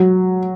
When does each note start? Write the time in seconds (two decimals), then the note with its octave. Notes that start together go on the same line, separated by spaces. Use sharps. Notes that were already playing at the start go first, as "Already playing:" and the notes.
Already playing: F#3